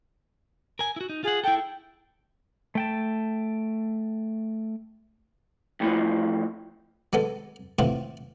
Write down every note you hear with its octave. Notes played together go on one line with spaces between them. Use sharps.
A#4 G#5
E4 F#4
D#4
F4 G#4 F#5
E4 A4 G5
A3 G5 A5
F2 A2 C3 E3 F3
F#3 G#3 B3 A4
A2 E3 C4 F4 F#4